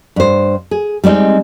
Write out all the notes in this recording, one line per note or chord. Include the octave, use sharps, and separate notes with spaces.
G2 C5
G#4
G3 G#3 C4 D#4